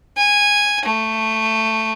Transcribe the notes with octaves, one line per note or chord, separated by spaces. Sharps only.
G#5
A3